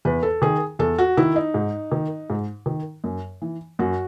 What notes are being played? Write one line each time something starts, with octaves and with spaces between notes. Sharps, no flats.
E2 B4
A4
D#3 G#4
E2 A4
F#4
D#3 E4
D#4
G#2
D#3
G#2
D#3
F#2
E3
F#2 F#4